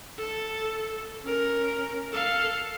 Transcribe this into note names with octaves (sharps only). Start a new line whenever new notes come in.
A4
C#4 A#4
A4 F5